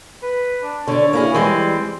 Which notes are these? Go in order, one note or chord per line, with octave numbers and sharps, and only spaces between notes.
B4
D4
D3 D4 C#5
A#3 E4 G#4
E3 G3 G#3 C4